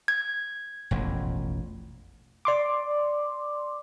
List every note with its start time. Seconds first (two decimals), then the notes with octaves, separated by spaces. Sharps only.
0.08 G#6
0.91 E1 A1 F2
2.45 D5 C6 D6